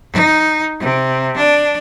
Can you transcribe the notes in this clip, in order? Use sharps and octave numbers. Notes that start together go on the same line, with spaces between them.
D#4
C3
D4